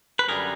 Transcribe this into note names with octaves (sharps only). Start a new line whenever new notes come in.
B4
F#2 D3 G3 G#4 A#4